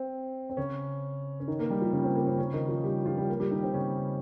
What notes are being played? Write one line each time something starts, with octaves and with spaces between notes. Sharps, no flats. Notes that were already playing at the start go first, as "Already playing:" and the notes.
Already playing: C4
C4
C#3 C#4
C#4
D#3 D#4
A#3 A#4
G3 G4
F3 F4
C#3 C#4
C4
A#3
C4
C#3 C#4
D#3 D#4
F3 F4
G3 G4
F3 F4
G3 G4
A#3 A#4
G3 G4
D#3 D#4
C4
C#3 C#4